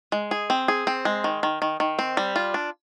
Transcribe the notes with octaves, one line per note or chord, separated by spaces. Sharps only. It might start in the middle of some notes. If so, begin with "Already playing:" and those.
G#3
G#4
C4
G#4
C4
G#3
D#3
D#3
D#3
D#3
C4
G3
F4
D4